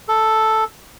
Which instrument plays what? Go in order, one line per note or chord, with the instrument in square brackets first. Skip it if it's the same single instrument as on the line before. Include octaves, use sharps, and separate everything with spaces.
[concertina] A4